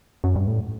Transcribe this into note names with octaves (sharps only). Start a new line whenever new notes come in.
F#2
G2
A2